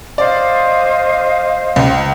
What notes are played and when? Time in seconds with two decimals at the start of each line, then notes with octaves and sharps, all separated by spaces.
0.18 C5 D5 D#5 F5
1.76 C#2